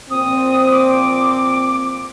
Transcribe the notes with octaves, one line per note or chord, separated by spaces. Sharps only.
A#2 F3 C4 D#6
D6